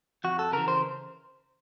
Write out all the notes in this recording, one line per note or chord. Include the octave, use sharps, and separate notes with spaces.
F2 F#4
A4
C#3 E3 A#4
C5